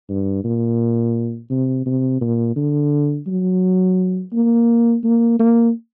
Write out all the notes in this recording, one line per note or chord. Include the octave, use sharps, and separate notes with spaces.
G2
A#2
C3
C3
A#2
D3
F#3
A#3
A#3
A#3